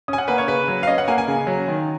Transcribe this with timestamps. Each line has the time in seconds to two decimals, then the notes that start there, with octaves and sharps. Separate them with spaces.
0.08 C#4 G#5 D#6
0.18 F#5
0.28 A#3 B4
0.38 C#5
0.48 C#3 B4
0.68 F#3
0.83 F5
0.87 C#4 D#5
0.98 F#5
1.08 A#3 G#5
1.18 G#5
1.28 C#3
1.47 F#3
1.68 D#3